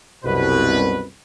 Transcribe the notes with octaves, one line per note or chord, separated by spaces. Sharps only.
C2 F#2 B2 B4